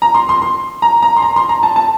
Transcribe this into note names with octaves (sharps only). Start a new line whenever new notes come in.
A#5
C6
C6
C6
A#5
A#5
C6
A#5
C6
A#5
A5
A5